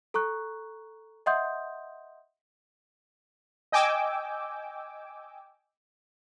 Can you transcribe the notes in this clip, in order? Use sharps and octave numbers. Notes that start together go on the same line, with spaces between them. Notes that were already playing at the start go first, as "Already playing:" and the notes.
A4 A#5 C#6 F#6
D#5 E5 F#5 C6 D#6 G6
D#5 G5 G#5 D6 E6